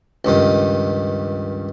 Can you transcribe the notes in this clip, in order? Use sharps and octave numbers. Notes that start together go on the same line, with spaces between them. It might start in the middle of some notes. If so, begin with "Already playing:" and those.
C#2 G2 D#3